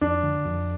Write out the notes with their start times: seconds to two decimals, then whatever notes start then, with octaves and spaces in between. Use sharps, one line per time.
0.01 F2 D4
0.23 D3
0.45 F2